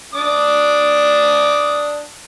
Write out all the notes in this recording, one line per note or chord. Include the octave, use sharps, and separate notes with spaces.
D4 D6 D#6